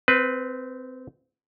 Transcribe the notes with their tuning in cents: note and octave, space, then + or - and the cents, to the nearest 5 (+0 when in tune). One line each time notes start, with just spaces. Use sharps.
C4 -20 B4 +0